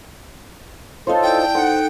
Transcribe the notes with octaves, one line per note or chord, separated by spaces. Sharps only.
D#4 F4 A4 C5 C#5
E4 D5 G5 A5
D#4 A4 C5 F#5